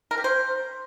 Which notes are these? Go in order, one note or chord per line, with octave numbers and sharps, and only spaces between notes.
A#4
G4
C5